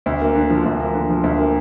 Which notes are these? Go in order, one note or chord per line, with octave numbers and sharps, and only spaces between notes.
D2
A#3
D3
F3
D2
A#3
D3
F3
D2
A#3